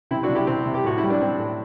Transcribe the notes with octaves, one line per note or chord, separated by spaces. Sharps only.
C3 C4 E4
D4 F#4
C3
E4 G4
C3 C4
C3
G4
A2 F#4
E4
G3
D4
G3 C4
A2